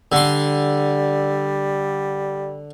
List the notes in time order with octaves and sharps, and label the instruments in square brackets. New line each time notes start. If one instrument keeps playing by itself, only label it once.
[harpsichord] D3 C6 [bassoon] G3